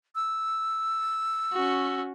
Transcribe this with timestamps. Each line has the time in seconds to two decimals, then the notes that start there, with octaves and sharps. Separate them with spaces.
0.15 E6
1.52 C#4 F#4